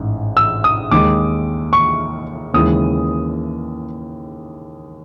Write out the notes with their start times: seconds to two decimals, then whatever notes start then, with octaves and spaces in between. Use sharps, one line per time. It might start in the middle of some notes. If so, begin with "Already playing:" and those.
Already playing: A1 G#2
0.37 E6
0.64 D#6
0.91 D#2 D#3 G#3 D6
1.73 C#6
2.54 D#2 C#3 E3 G#3 D#6